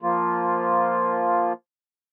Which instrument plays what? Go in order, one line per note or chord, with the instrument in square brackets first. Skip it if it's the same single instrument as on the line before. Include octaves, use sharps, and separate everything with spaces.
[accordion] F3 A#3 F4